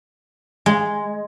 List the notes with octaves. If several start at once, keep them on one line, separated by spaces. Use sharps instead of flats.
G#3